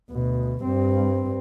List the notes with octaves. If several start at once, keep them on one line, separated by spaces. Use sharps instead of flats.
D2 B2
G2 C4